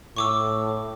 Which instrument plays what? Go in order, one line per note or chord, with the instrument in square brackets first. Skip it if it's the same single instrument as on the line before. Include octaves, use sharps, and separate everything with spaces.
[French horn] A2 [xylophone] C#6 D6 E6